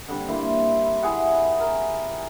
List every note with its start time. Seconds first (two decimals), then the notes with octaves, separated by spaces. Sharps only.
0.08 D3 G3 C4
0.28 A#3 E4 C5
1.02 E4 G#4 F#5 G5
1.60 A#4